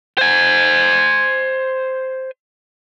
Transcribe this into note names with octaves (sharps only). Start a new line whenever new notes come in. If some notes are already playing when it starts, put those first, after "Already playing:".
C5 G#5